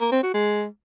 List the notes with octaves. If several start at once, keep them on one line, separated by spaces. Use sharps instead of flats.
A#3
C4
F#4
G#3